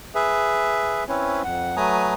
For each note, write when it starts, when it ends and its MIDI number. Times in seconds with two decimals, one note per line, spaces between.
0.15 1.04 68
0.15 1.04 71
0.15 1.04 76
1.09 1.42 60
1.09 1.42 61
1.09 1.42 64
1.09 1.42 71
1.09 1.42 73
1.44 1.76 41
1.44 1.76 78
1.77 2.14 54
1.77 2.14 57
1.77 2.14 71
1.77 2.14 80
1.77 2.14 82
1.77 2.14 87